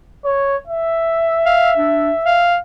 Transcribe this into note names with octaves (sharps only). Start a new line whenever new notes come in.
C#5
E5
F5
D4
F5